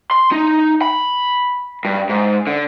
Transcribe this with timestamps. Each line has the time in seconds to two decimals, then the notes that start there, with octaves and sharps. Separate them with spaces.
0.11 C6
0.32 D#4
0.82 B5
1.85 G2
2.09 G#2
2.47 D3